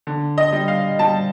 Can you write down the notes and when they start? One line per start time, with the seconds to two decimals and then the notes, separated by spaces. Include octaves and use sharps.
0.07 D3
0.38 D#5
0.53 G3
0.68 F5
0.99 G3 A5